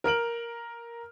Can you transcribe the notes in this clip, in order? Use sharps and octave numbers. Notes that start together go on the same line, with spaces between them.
A#4 F6 D7 F#7